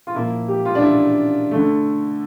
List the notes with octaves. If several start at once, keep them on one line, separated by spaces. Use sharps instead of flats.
F4
A#2 F3 A#3 E4
G4
F4
D4
E4
D3 A3